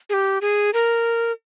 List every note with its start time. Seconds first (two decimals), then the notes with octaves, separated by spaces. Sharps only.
0.10 G#4
0.14 G4
0.41 G#4
0.74 A#4